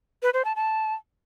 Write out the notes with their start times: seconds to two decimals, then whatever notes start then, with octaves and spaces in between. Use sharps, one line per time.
0.23 B4
0.34 C5
0.45 A5
0.56 A5